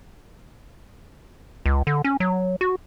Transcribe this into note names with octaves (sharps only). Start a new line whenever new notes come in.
C#2
D3
C#4
F#3
F#4